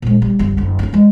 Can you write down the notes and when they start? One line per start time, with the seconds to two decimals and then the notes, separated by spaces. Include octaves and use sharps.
0.02 A#2 G#3
0.22 G3
0.39 G1 G3
0.57 F#1 D3
0.79 C#4 D#4
0.93 E3 G#3